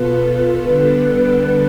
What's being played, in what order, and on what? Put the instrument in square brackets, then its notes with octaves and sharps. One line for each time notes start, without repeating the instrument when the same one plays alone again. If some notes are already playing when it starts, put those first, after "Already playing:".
Already playing: [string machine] B2 B3 F4 A4 [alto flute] B4
[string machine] D3 G3 B3 D4 A4 [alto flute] B4